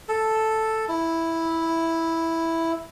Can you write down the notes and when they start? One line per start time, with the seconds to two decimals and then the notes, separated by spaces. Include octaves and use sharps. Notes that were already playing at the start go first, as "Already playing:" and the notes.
0.09 A4
0.89 E4